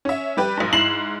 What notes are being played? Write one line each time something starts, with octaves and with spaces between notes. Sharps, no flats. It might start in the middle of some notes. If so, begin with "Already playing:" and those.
C#4 E5
G3 G4 B4
B1 G#2
G#2 E4 C7 E7 F#7